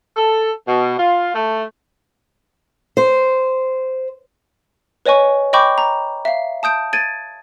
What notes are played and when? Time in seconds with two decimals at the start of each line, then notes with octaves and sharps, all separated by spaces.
0.17 A4
0.66 B2
0.98 F4
1.34 A3
2.97 C5
5.06 B4 C#5 D#5 G#5 C#6
5.53 D#5 G5 B5 C#6 D6 G6
5.78 A#5
6.25 E5 F5
6.63 A5 D#6 G6 D7
6.93 G#6 A6 D7 D#7